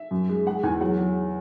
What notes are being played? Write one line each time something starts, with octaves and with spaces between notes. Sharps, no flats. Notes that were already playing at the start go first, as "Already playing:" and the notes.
Already playing: E5
F#2
G#3
G#3 F#5
E2 G#5
F#3 F#5
F#3